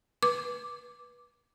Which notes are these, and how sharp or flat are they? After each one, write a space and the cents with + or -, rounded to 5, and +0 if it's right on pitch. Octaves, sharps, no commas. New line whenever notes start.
B4 -20 D6 +0